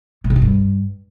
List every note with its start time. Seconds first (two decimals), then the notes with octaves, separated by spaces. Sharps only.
0.24 A2
0.30 C3
0.36 D#3
0.42 G2